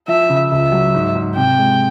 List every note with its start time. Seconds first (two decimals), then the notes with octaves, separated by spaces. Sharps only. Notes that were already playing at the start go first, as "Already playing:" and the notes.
0.08 F3 E5
0.30 C#3
0.52 C#2 E5
0.72 F#3
0.94 G#2
1.15 G#2
1.36 C3 G5
1.58 G#3